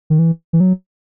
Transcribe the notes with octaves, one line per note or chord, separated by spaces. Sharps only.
D#3
E3
E3
F#3